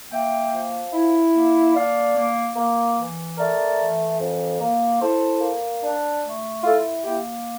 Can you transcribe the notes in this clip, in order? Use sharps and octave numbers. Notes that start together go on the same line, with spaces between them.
A#3 E5 G5
F3
E4
A#3
D4 D5 F5
A#3
A#3
E3
A3 A#4 D5
E3
F2
A#3
E4 A4 C5
A#3
D4
A3
E4 F4 A4
A#3 E4 G4